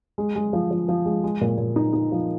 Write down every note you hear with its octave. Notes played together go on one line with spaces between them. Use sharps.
G#3
G#3
F3
F3
F3
G#3
G#3
A#2
A#2
D#4
D#4
F3